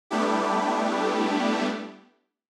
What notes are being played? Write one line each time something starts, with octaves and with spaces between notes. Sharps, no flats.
G3 A3 B3 D4 E4 G4